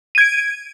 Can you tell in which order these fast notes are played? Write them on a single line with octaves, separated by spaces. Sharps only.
D#7 G#6 D7